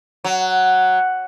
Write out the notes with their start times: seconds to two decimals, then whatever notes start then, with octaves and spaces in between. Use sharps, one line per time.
0.24 F#3